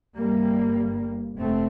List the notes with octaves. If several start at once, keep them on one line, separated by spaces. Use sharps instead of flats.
G1 G2 G3 A#3
F1 A3 C4